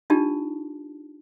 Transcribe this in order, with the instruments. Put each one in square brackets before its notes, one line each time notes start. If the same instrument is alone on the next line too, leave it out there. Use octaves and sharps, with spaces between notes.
[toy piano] D4 D#4 F4 G4 A5